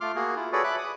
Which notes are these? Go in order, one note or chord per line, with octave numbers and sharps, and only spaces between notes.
A3 F4 C6 D6 F6
A#3 F#4 G#4
E4 F4
F#4 G#4 A4 B4 C#5 D5
E5 B5 D6 F#6
D6 D#6